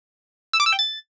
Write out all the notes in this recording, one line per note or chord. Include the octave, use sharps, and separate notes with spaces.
E6
D6
E6
G5
A6